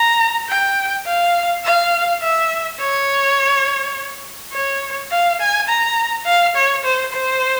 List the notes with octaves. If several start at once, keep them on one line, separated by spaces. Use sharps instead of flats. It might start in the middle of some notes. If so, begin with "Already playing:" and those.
Already playing: A#5
G5
F5
F5
E5
C#5
C#5
F5
G#5
A#5
F5
C#5
C5
C5